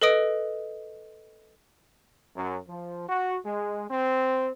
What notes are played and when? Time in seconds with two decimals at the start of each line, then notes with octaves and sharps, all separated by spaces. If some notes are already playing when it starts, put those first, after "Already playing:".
0.02 A4 B4 D#5 D#6 D7
2.36 F#2
2.68 F3
3.09 F#4
3.45 G#3
3.90 C4